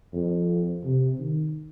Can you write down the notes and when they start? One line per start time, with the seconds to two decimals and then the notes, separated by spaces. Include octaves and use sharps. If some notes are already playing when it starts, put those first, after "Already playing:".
0.13 F2
0.84 C3
1.19 D#3